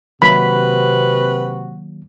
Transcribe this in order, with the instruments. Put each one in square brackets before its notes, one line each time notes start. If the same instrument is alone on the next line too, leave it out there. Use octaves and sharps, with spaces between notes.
[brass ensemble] C3 C4 F#4 [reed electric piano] D#3 F#3 A#3 [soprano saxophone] B4 [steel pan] B5